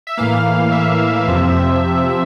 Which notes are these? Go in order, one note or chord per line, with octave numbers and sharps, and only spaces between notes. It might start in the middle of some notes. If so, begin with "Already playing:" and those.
E5
A2 E3 A#3 F5
F5
E5
F2 C3 F3 C4